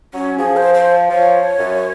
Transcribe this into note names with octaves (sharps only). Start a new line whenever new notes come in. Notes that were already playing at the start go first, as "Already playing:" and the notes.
F#3 C#4
F3 G#4
C5
C5
F3 C#5
F#2